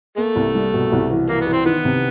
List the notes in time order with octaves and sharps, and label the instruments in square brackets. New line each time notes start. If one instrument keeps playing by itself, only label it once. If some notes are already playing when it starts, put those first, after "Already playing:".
[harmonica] A3 [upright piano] A#3
[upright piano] C2
G3
B2
C2
E3
[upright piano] E3 [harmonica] A#3
[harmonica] B3
[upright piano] E3
[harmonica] C4
[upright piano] D#3 [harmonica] B3
[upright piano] C3